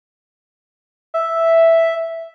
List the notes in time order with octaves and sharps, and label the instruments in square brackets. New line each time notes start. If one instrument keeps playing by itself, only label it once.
[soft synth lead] E5